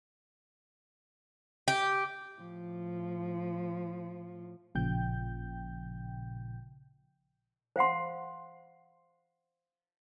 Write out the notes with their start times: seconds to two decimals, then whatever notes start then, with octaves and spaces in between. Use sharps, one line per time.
1.68 G4
2.37 A2 F3
4.75 A1 A#2 C#3 F3 G5 G6
7.76 C5 F5 F#5 C6